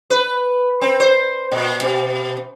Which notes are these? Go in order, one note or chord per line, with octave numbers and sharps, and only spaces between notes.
B4
C4
C5
A#2
B2